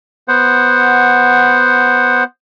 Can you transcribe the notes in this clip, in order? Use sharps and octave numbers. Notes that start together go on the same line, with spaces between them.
B3 C5 F#5